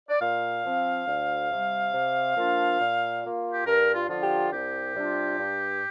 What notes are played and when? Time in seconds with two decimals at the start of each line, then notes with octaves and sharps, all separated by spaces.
0.09 D5
0.20 A#2 F5
0.64 F3 C4
1.06 D2
1.50 C3 G3
1.93 C3
2.36 F3 A#3 D4 F4
2.80 A#2
3.22 A#3 F4
3.54 G4
3.66 G2 A#4
3.94 F4
4.09 D3 F3 D4 F4
4.23 G4
4.52 C2 G4
4.95 C3 G3 D4 F4
5.38 G2